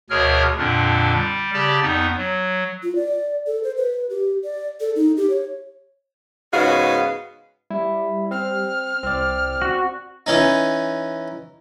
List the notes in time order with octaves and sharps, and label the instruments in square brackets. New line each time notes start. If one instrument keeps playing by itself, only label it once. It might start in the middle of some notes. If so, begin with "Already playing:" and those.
[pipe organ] D2 B2 G#4 A#4 C#5 F6
F2 A#2 D3 D4
G3
C#3 G4 D5 A5
F2 B3 D#4
F#3
[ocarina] F4
D5
A4
C5
B4
G4
D5
A4
D#4
G4
C#5
[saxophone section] G#2 C#3 B3 F#4 D#5 F5
[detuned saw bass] G3 [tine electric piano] E4
[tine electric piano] C4 [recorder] F6
[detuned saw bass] C2 [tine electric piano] C4 D5
[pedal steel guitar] F#4
[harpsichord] E3 C#4 D#4